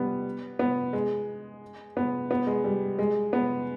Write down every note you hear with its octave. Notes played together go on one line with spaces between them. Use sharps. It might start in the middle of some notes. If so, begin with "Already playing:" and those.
Already playing: G3 B3
B3
G#3
B3
B3
G#3
G3
G#3
B3